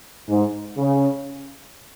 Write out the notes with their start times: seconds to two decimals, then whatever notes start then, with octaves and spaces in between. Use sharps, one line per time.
0.29 G#2
0.78 C#3